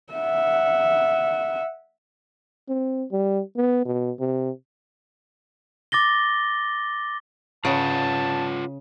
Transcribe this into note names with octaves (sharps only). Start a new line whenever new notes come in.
E5 F#5
C4
G3
B3
B2
C3
D6 A6 A#6 G7
C#3 F4 B4 F#5 A5